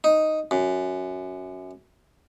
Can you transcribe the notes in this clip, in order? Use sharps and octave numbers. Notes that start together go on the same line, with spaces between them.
D#4
F#2